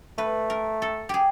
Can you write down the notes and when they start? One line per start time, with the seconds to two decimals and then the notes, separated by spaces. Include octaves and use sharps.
0.18 A3 B4
0.50 A#4
0.82 A4
1.09 G4 G#4